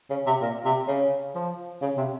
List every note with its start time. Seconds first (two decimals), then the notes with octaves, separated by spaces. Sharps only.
0.10 C#3
0.26 C3
0.41 A#2
0.65 C3
0.88 C#3
1.35 F3
1.82 C#3
1.97 C3